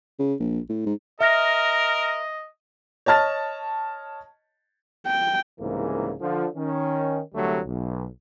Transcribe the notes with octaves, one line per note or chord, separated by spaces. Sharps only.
C#3
A#1
A2
G#2
A#4 D#5 E5 F6 A#6
C#5 D#5 A5 F6 A6
G5
C2 G#2 C#3 E3 A#3
D3 F3
D#3 C#4
C2 D3 F#3 G3 A3
B1